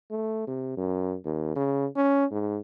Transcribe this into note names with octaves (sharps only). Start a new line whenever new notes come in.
A3
C3
F#2
D#2
C#3
C#4
G#2